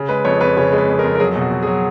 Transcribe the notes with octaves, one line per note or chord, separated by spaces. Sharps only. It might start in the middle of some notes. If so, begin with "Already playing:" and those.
Already playing: C#3
G#3 B4
F2 C#5
F2 B4
C#3 C#5
G#3
B4
F2
A#4
F2
A#4
F#3 G#4
B2
F#4
B2
G#4
F#3